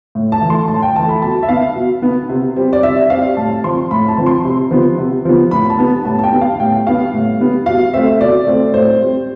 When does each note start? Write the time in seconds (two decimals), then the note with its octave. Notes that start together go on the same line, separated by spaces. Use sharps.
0.15 A2
0.32 A5
0.41 E3 A3
0.50 C6
0.68 A2 A5
0.83 G5
0.96 E3 A3 A5
1.09 B5
1.22 B2 A5
1.43 E5
1.49 B3 F5
1.75 B2
2.02 B3
2.29 C3
2.56 G3 C4
2.73 D5
2.83 C3 E5
3.10 G3 C4 F5
3.37 A2 A5
3.64 F3 C4 C6
3.91 A2 B5
4.08 A5
4.18 F3 C4
4.26 C6
4.45 C3
4.71 F3 B3
4.98 C3
5.25 F3 B3
5.51 A2 B5
5.70 A5
5.79 G3 B3
6.05 A2 A5
6.19 A5
6.24 G5
6.32 G3 B3
6.41 F5
6.60 A2 G5
6.86 G3 B3 F5
7.14 A2
7.40 G3 B3
7.66 B2 F5
7.94 A3 C4 E5
8.21 B2 D5
8.47 A3 C4
8.74 A2 C5
9.02 G3 C4